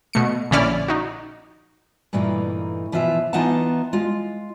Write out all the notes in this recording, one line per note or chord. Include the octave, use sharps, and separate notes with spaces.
B2 A3 C#7
A#1 D3 C#4 E4 D5 F6
D#4 F#4
G2 A#2 E3 A3 A#3 D#4
B2 E3 F3 F4 E5
E3 B3 D#4 F4 F#5 A5
G#3 F4